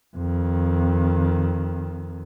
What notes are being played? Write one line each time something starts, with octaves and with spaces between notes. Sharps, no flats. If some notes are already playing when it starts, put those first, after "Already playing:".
F2 D#3